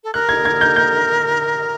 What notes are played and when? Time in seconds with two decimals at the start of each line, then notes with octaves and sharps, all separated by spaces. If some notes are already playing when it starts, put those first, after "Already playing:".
0.04 A4
0.14 A#4 F#6
0.29 G#6
0.45 G#6
0.61 G6
0.76 G6